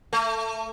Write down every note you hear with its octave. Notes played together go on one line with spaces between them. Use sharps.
A3